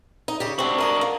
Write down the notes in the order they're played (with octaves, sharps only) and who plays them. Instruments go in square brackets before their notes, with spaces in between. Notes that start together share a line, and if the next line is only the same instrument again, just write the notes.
[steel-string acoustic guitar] D#4
C#3 G4
[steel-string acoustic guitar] C3 C4 [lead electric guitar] D4 F#4
[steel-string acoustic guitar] A#4 D#5
A#3